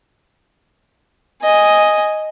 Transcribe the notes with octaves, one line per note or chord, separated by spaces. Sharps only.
D#5 G#5